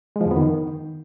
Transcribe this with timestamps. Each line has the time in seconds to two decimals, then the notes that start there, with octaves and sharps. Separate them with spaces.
0.16 G#3
0.21 F3
0.26 F2
0.31 B3
0.36 D#3